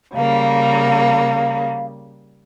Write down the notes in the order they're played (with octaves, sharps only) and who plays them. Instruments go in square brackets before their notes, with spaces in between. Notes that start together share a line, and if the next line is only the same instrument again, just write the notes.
[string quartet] C#3 G3 A#3 [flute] F5